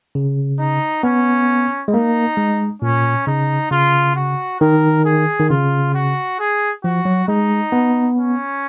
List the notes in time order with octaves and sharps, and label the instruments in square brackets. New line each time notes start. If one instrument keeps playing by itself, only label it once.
[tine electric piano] C#3
[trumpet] D#4
[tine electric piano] B3 [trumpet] C#4
[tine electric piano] G#3
[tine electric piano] A#3 [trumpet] D#4
[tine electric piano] G#3
[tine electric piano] A#2 [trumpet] C#4
[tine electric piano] C#3 [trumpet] D#4
[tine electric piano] C#3 [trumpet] F4
[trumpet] F#4
[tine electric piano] D#3 [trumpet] A#4
[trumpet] G#4
[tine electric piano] D#3
[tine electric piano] C#3 [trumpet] F4
[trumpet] F#4
G#4
[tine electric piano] F3 [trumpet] F#4
[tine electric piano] F#3
[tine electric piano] G#3 [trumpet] D#4
[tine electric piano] B3
[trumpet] C#4